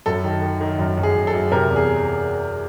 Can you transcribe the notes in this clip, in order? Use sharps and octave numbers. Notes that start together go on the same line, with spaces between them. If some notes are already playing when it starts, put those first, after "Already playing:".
F#2 A4
D#3
D#3
D#3
F#2
F#2
G#4
F#2
A4
F#2
C3 A#4
E2
G#4